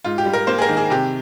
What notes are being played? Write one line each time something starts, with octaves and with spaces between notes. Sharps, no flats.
G#2 F4
G4
G3
A#4
A#3 C5
G#4
A#4
D#3
G#4
C3 G4